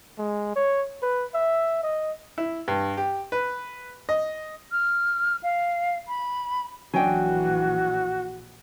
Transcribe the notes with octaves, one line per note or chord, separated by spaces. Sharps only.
G#3
C#5
B4
E5
D#5
E4
G2
G4
B4
D#5
F6
F5
B5
A#1 E3 F#3 D4 F#4 G5 G#5